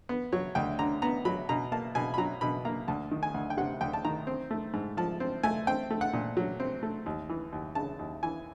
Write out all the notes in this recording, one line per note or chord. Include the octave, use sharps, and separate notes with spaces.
B3
F#3 C#5
D2 G5
D3 A#5
B3 A#5
F#3 B5
B2 A#5
A#3 A5
B2 G#5
B5
F#3 A#5
B2 B5
A#3 A#5
D2 A5
D#3
G#5
D2
G5
C3 F#5
D2 G5
A5
D#3 A#5
C4
A3
G#2
F3 A5
C4
A3 G#5
C4 G5
A3
F#5
A#2
F#3
C4
A3
D#2
E3
D#2
C#3 A5
D#2
E3 G#5